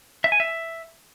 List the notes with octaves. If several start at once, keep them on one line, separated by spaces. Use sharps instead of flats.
E5
G#5
E5